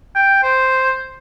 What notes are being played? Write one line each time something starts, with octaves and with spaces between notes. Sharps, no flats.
G5
C5